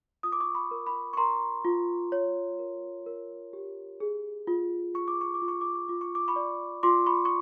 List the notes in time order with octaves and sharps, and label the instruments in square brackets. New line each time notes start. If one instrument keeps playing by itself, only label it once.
[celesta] F4 D#6
D6
C#6 D#6
B5 C#6
A#4
B5 C#6
C#6
A#4 A#5 C6
F4
C#5
A#4
A#4
G4
G#4
F4
F4 C#6
D6
C#6
D6
F4
C#6
D6
C#6
F4 D6
C#6
D6
B5 C#6
D5
F4 C6 D6
B5 C#6
C#6